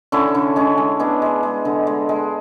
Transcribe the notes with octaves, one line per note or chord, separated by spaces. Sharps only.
D3 C#4 E4
D3
G#3 C#4
G#3
G#3 B3 D4
G#3
G#3
D3
G#3
G#3